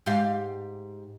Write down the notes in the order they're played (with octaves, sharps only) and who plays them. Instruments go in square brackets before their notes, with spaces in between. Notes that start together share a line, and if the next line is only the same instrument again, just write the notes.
[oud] G#2 G4 F5